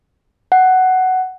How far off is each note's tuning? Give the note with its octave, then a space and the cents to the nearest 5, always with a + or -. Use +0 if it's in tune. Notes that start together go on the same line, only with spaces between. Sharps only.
F#5 +10